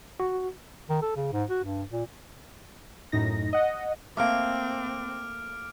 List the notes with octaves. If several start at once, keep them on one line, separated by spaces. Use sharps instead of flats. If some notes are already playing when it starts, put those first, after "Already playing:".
F#4
D#3
A4
C#3
G#2
F#4
G2
A#2
F#2 A2 D#4 A#6
D#5 F#5
A3 A#3 C4 D6 F6 D7